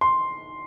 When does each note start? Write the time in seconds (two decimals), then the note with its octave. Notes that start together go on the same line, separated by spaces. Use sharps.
0.01 C6